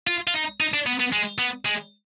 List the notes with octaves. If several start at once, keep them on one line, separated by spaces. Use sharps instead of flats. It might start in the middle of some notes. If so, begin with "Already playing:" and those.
F4
F4
D#4
D#4
D4
B3
B3
G#3
B3
G#3